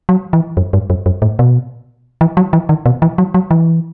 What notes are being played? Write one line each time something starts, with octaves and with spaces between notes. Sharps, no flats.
F#3
E3
F#2
G2
F#2
F#2
A2
B2
E3
F#3
E3
D#3
B2
E3
F#3
F#3
E3